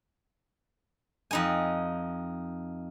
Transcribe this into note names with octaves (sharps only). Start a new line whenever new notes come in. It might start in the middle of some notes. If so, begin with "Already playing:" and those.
F2 D#4 G#5